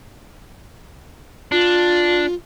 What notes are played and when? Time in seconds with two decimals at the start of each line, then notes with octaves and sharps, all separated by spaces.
1.52 D4 F4